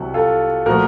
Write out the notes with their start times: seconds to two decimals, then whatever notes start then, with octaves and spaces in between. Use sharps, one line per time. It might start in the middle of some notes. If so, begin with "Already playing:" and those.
Already playing: C2 C3 F#3 F#4
0.14 F4 A4
0.66 A#2 F3 A3 F#4 A#4